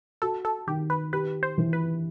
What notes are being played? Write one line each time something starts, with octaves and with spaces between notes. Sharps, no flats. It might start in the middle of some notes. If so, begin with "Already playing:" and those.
F#4 A4
A4
D#3 G4
B4
G4 B4
C5
E3
B4